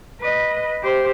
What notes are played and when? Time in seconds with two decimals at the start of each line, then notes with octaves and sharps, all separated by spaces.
0.20 B4 D#5
0.83 G4 C5